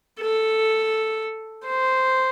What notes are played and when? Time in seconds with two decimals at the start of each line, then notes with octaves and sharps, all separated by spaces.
0.20 A4
1.67 C5